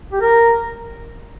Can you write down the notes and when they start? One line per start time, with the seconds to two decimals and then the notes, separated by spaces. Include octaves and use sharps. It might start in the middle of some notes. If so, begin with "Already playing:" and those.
0.12 G4
0.21 A#4